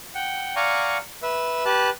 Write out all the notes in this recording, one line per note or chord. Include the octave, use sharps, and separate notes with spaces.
F#5 G5
D5 F5 F#5 G#5 A#5 C#6
B4 E5
G4 B4 A5 F#6